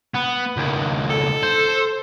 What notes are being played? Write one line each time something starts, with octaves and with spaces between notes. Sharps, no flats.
B3
C#2 D#3
A4
C5